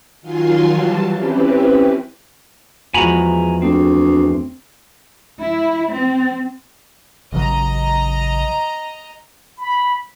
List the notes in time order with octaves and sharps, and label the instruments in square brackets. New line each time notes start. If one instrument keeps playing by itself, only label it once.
[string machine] D#3 F#3 F4 G#5 C6
E3 F#3 G3 A5
C4 C#4 E4 G4 B4
[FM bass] E2 [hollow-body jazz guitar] F3 G#3 F#4 [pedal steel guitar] G#5 A#5 B5
[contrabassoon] D2 [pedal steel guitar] C4
[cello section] E4
C4
[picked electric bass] A1 C#3 F#3 [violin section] D#5 A#5
[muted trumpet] B5